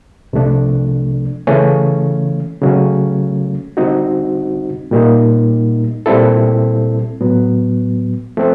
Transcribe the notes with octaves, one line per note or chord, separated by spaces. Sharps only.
C2 C3 F3 A3 D4
C#3 E3 A3 C#4
C#3 F#3 A3 C#4
D3 G3 C4 D#4 F#4
A#2 G3 A#3 D#4
A#2 G3 C4 E4 A4
A2 F#3 B3
F3 A3 C4